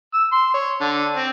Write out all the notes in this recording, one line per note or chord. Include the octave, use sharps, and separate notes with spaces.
E6
C6
C#5
D3
C4